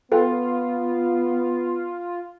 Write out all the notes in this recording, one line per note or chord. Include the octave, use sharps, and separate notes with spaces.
B3 F4 A4 B4 G5